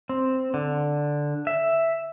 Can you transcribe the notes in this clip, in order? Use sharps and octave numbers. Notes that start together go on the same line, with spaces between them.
C4
D3
E5